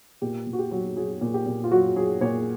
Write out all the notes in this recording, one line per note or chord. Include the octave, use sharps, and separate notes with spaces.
A#2 G4
A#2
F#4
G4
F#3
F#3 G#4
A#2
G4
A#2
F4
F#3 F#4
F#3 G#4
A#2 C#5